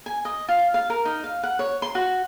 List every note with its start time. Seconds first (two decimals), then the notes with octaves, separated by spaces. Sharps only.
0.06 G#5
0.25 D#5
0.48 F4
0.74 F5
0.90 A#4
1.05 D#4
1.24 F5
1.43 F#5
1.59 C#5
1.82 C6
1.95 F#4